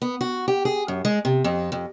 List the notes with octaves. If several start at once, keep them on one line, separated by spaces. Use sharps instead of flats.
B3
F#4
G4
G#4
F#2
G#3
C3
F2
F2